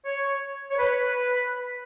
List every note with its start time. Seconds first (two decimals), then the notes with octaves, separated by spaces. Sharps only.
0.05 C#5
0.70 C#5
0.78 B4